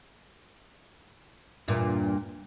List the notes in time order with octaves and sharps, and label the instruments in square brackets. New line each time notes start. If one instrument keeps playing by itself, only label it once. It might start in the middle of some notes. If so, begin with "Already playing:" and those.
[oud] E2 G2 A#2